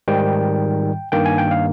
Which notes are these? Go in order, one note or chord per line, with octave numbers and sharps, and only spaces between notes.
G#2 D#3 G3 G5
G2 D#3 A#3 G5
G#5
G5
F5